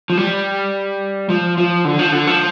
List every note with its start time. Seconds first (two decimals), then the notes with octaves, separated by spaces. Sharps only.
0.10 F3
0.17 G3
1.29 F3
1.58 F3
1.85 D3
1.99 F3
2.12 D3
2.27 F3